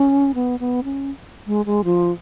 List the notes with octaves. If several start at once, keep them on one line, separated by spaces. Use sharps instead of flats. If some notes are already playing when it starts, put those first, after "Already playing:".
Already playing: C#4
B3
B3
C#4
G#3
G#3
F3